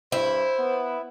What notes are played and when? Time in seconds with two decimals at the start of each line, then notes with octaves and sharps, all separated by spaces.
0.12 G2 E4 C5
0.59 B3